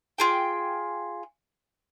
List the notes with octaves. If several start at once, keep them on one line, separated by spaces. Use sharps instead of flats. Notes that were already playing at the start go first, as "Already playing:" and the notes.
F4 G#4 G5